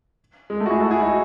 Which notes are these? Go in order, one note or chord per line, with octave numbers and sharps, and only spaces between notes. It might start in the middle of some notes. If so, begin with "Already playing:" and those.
G#3
A3
F#4
E4 G#4
F#4 A4
E4 G#4
D#4 F#4